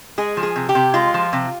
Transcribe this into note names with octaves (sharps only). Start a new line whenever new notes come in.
G#3 G#4
F3
G#4
C3
G4
C3
G#3 F4
F3
C3